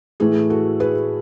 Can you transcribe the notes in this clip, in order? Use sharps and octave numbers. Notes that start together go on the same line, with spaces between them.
A2 E3 A3 G#4
F#4 A4
G#4 B4